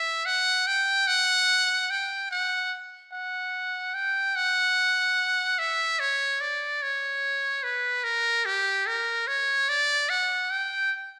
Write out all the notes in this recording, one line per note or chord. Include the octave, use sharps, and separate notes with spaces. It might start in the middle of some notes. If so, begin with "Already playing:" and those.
Already playing: E5
F#5
G5
F#5
G5
F#5
F#5
G5
F#5
E5
C#5
D5
C#5
B4
A#4
G4
A#4
C#5
D5
F#5
G5